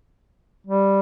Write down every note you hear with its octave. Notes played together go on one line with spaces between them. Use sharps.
G3